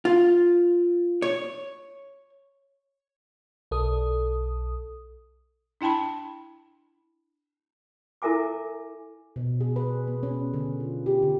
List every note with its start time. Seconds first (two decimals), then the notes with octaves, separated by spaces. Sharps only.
0.05 F4
1.22 C#5
3.71 B1 A4 D#6
5.81 D4 E4 G5 A5 B5
8.22 E4 A4 A#4 E5 G#5 D6
9.36 B2
9.61 G#4
9.76 B4
10.07 B3
10.23 C#4
10.54 D3
10.80 F4
11.06 G4
11.22 D3